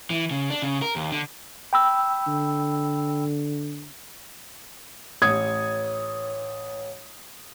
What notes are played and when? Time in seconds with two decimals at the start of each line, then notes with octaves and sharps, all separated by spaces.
0.10 E3
0.31 C#3
0.50 D4
0.62 C#3
0.82 A#4
0.96 D#2
1.11 D3
1.73 G5 B5 E6
2.27 D3
5.22 A1 C#5 D#6 G#6